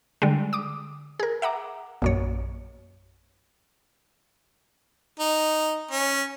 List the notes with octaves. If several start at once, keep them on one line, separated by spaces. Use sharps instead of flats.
D3 G3 G#3
D6 D#6
G#4 A#4
E5 F#5 A#5 D6
A#1 F#2 C#5
D#4
C#4